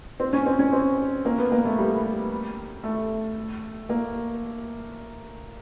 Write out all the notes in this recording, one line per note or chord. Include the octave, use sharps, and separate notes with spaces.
C4
C#4
C4
C#4
C4
A#3
B3
A#3
A3
G3
A3
A#3